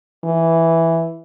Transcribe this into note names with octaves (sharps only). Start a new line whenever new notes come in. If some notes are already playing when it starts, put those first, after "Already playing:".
E3